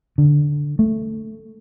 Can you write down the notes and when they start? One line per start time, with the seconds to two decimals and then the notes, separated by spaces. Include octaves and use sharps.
0.18 D3
0.79 A3